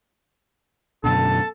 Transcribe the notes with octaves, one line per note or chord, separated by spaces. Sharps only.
F#2 B2 D3 A4 A5